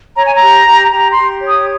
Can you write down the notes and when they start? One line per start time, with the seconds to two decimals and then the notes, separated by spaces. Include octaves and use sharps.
0.16 C#5 A#5
0.25 G#5
0.34 A#5
0.42 G4
0.66 G4
0.92 G4 A#5
1.10 C6
1.17 G4
1.41 C#5
1.48 D#6